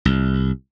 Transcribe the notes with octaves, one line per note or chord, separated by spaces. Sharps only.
C2